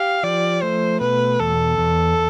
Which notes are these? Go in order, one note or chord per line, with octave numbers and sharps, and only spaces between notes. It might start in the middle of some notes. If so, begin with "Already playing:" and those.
Already playing: G4 F5
F3 D5
A3 C5
B2 B4
E2 A4
E2